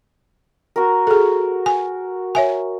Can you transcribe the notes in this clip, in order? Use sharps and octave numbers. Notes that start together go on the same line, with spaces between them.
F#4 A#4
G#4 A4
G#5
C#5 E5 G#5